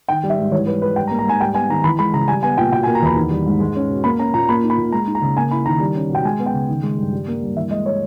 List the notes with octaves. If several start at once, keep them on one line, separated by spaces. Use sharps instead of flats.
D#3 G5
G3
E5
G#2
E3 C#5
G3 B4
G#2 B4
G3 G5
A#5
A#3
A#5
G#2 G#5
G3 G5
B3 G#5
D#3 A#5
E3 B5
G#3 B5
C#3 A#5
G3 G#5
B3 G#5
A#2 G5
B2 G5
G#5
A#3
A#5
E2 B5
D#3
G3
G#2
G#3
C#4
B2
A#3 B5
C#4 A#5
A#2 A#5
A#3 B5
D#4
B5
A#2
G#3 A#5
D#4
A#5
C#3
A#3 G#5
E4 B5
D#3 A#5
G3
C#4
B2
G5
G#3 G#5
B3
G5
C#3
D#3
G#3
G2
G3
A#3
G2
E3 E5
G#3 D#5
C#5